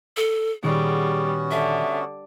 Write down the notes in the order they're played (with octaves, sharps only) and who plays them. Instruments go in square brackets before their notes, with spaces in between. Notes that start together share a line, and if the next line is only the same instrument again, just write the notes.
[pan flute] A4
[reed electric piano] A#2 D#3 [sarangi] G3 [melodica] B3 C#4 F#4 [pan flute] G#4
[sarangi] D3 [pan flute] E5